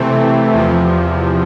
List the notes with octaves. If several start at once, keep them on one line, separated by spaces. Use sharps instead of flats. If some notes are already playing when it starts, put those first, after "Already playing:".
Already playing: C3 E3 A3 C4
E2 C3 F3